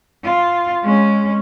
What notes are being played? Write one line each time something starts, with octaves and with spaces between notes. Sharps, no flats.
F4
G#3 C#4